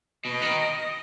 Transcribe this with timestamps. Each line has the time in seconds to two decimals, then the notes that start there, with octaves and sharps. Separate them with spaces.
0.25 B2 D#5
0.42 D#3